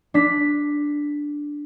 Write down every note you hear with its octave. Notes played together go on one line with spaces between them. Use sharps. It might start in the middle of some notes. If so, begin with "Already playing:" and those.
D4 B6